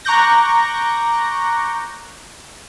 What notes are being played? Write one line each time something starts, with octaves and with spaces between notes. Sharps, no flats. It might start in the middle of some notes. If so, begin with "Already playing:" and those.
A#5 C#6 D6 F#6 G6 A#6